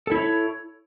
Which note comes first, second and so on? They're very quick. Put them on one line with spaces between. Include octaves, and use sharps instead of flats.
A4 E4 C#5